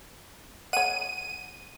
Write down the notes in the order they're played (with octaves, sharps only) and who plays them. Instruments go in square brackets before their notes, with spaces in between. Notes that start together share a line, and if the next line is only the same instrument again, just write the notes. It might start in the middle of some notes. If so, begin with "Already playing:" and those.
[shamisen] C#5 F#5 [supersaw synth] D#7